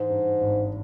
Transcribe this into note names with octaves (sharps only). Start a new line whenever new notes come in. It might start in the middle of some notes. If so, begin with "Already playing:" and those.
Already playing: G#2 E3
G2
G#1